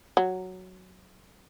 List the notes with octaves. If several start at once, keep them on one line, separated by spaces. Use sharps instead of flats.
F#3